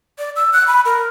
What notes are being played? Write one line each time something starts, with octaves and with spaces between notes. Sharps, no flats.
D5
E6
F#6
B5
A#4